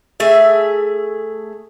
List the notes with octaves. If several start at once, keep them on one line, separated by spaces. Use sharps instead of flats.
A3 G#4 E5